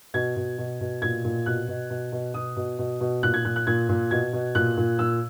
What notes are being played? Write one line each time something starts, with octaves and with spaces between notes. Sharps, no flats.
B2 G#6
B2
B2
B2
A#2 G#6
A#2
B2 F#6
B2
B2
B2
B2 D#6
B2
B2
B2
A#2 F#6
G#6
A#2 F#6
F#6
A#2 G#6
A#2
B2 G#6
B2
A#2 F#6
A#2
A#2 E6